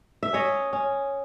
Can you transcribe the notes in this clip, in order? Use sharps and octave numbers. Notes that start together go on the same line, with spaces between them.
E5
C#4 C#5 D#5
C#4